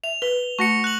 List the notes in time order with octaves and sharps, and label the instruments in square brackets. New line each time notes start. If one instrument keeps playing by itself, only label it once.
[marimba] E5 [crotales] F7
[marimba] B4 [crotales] G7
[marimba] A3 F#4 F#5 [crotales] C#6 A#6 C#7
[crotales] F#6 F#7